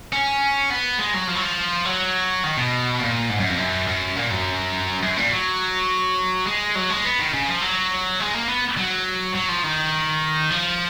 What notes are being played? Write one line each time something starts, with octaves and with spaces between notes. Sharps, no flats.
C#4
B3
G#3
F#3
F3
F#3
F3
F#3
D#3
B2
A#2
G#2
F#2
F2
F#2
F#2
A#2
F#2
F#2
A#2
F#3
G#3
F#3
G#3
B3
D#3
C#3
F3
F#3
G#3
A#3
B3
F#3
F#3
F3
D#3
F3